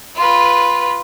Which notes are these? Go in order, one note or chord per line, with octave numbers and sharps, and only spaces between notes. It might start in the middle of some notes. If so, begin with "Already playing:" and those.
F4 B4